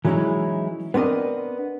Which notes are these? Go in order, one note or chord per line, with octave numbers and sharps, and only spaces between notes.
E3 F#3 G#3 C#4 D#4 E4
B3 C4 D4 A#4 D#5